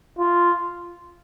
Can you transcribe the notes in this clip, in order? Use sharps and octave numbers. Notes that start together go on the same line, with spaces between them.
F4